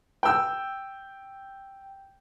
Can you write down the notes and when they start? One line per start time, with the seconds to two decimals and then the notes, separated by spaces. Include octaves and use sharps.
0.23 G5 E6